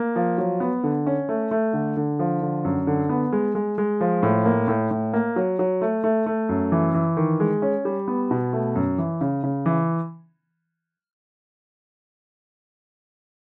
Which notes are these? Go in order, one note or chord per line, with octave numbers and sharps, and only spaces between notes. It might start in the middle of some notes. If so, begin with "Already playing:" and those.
Already playing: A#3
F3
F#3
B3
D3
C#4
A3
A3
D3
D3
F3
D3
F#2
D3
B3
G#3
G#3
G#3
F3
A2
A#3
A2
A2
A#3
F#3
F#3
A3
A3
A3
F#2
E3
E3
D#3
G#3
C#4
G3
B3
B2
A3
F#2
E3
C#3
C#3
E3